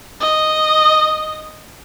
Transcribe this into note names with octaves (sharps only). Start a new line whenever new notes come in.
D#5